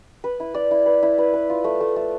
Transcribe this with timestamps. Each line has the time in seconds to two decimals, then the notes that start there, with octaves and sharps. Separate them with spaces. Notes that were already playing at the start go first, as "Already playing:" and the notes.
0.24 B4
0.40 E4
0.54 D5
0.71 E4
0.86 B4
1.03 E4
1.18 B4
1.34 B4
1.50 F4
1.64 A3
1.81 A3
1.96 A3